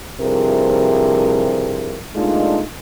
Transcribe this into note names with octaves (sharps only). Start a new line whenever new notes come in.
G2 C3 F3 E4 G#4 A#4
A#2 G#3 A3 D4 D#4 F4